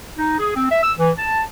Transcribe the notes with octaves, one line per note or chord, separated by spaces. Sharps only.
D#4
G#4
C4
E5
E6
E3
A5